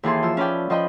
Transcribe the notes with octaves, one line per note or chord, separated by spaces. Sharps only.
D#2 E3 G#4 A4 G5 C6
F3 E6
C#4 B4 D5 G5
F3 D#5 G5 B5